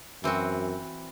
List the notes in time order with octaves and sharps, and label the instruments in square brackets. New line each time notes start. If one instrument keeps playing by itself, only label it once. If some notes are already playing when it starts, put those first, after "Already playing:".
[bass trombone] F#2 [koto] E3 C4 F#4